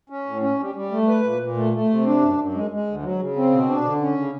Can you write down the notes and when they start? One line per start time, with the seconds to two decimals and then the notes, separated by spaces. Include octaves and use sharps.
0.10 C#4
0.26 A2
0.42 C#4
0.59 G3
0.75 G3
0.91 A3
1.08 B4
1.24 A#2
1.40 A#2
1.57 A3
1.73 A3
1.89 C3
2.05 D4
2.22 F#2
2.38 F#2
2.54 G#3
2.71 G#3
2.87 D2
3.03 F#3
3.19 C#3
3.36 C4
3.52 B2
3.68 D4
3.84 D3
4.01 C#4
4.17 C#3